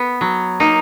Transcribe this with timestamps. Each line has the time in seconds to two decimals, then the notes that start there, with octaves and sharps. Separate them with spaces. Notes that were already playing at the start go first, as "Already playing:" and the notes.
Already playing: B3
0.21 F#3
0.60 A#3 D#4